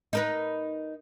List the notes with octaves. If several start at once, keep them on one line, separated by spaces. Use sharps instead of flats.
D#4 A#4 B4